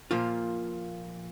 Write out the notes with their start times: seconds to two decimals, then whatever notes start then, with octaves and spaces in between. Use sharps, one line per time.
0.11 A#2 F3 A#3 F4